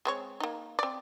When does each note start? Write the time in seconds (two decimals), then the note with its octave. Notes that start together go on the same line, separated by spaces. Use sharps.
0.05 G#3 C4 C#5
0.40 A#3 D#4
0.79 C4 D5